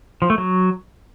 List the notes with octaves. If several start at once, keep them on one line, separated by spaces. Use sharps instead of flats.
F3
A3
F#3